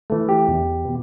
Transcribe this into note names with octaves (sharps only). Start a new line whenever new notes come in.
E3 A3
G4
E2
B2